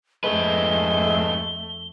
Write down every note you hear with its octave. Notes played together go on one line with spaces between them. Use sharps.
F2 G#2 G#3 A3 B4 G7